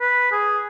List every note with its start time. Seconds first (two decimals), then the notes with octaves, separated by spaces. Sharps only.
0.01 B4
0.32 G#4